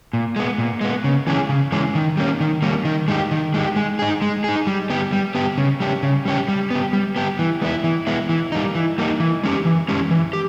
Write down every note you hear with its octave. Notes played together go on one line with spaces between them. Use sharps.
A#2
G#3 B3
A#2
G#3 B3
C#3
E3 G#3 C#4 G#4
C#3
E3 G#3 C#4 G#4
D#3
G3 A#3 C#4
D#3
G3 A#3 C#4
D#3
G#3 D#4 G4
D#3
G#3 D#4 G4
G#3
D#4 G#4
G#3
D#4 G#4
G3
B3 G4
G3
B3 G4
C#3
G3 C#4 G4
C#3
G3 C#4 G4
G3
B3 G4
G3
B3 G4
E3
G#3 B3 E4
E3
G#3 B3 E4
E3
G3 A#3 D#4
E3
G3 A#3 D#4
E3
G#3 C#4 G4
E3
G#3 C#4 G4
E3
G4